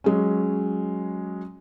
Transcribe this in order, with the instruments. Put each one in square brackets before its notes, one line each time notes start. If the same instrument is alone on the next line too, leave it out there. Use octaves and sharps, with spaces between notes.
[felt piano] F#3 G#3 C#4